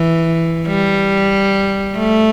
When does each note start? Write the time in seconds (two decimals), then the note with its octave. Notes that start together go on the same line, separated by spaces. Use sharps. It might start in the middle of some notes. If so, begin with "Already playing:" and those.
Already playing: E3
0.67 G3
1.97 A3